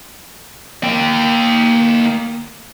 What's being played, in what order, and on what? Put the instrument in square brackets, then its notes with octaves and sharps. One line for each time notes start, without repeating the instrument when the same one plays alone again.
[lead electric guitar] A#3 G5